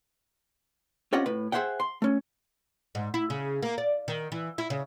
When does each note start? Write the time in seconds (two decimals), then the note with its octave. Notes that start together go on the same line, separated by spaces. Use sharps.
1.13 C4 C#4 F4 G4 D#5 F#5
1.26 A2 B4
1.52 G#4 C5 E5 F#5 G5
1.80 C6
2.02 A3 C#4
2.95 G#2
3.14 E4
3.30 C#3
3.63 A#3
3.78 D5
4.08 D#3
4.32 E3
4.58 E4
4.70 C#3